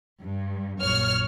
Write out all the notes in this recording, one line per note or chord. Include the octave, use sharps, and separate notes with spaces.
G2
A#1 F#2 C#5 F6